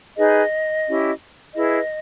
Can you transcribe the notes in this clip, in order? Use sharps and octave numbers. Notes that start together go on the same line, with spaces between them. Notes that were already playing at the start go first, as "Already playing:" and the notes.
D#4 G#4 B4 D#5
C#4 E4 G4
E4 G#4 B4 D#5